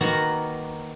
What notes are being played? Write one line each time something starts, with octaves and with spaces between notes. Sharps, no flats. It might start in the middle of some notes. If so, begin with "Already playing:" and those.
D#3 A#3 B3 F#4 F#5 A#5